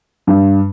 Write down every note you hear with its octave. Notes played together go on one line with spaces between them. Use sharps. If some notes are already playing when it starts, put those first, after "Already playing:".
G2